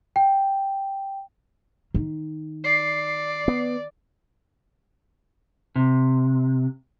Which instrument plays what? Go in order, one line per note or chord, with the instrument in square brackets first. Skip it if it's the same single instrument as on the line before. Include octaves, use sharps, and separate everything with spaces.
[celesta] G5
[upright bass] D#3
[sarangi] D5 [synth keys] C7
[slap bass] B3
[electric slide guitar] C3